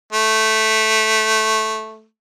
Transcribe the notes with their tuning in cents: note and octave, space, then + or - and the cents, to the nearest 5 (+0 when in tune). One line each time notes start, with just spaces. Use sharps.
A3 -5